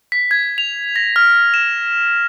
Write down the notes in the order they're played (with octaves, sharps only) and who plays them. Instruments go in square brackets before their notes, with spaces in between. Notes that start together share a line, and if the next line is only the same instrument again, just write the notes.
[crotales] B6
G#6
F7
A#6
F6
E7